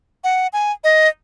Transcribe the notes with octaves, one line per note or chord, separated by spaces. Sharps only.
F#5
G#5
D#5